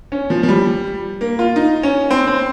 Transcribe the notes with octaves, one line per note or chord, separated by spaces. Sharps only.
C#4
F3
F3
G3
A#3
F4
D#4
C#4
C4
C4